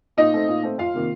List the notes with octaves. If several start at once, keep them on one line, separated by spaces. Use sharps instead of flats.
A#2 D#4 D#5
A3 C4
A#2
A3 C4
F2 F4 F5
C3 D#3 A#3